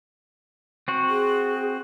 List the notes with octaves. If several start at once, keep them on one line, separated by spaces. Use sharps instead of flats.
C4 F#4
G#4